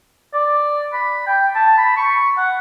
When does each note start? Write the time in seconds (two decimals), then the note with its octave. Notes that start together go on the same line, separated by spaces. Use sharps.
0.33 D5
0.93 B5
1.26 G5
1.55 A5
1.77 B5
1.96 C#6
2.37 F#5